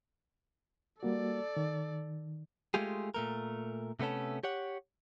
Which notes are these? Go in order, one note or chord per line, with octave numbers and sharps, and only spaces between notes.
G3 A#3 F#4 A4 D5
D#3
G#3 A3 F4 G4 G#4
A#2 A3 A#4
C3 A3 B3 C#4 A4
G4 C#5 F#5